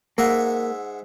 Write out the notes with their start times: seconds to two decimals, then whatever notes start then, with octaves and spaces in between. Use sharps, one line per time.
0.18 G#2 A#3 E5 F#5